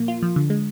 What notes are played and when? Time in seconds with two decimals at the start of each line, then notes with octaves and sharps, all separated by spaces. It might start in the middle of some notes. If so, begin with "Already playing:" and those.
Already playing: A#2 F3 A#3
0.08 F4
0.22 F3
0.36 D3
0.50 G#3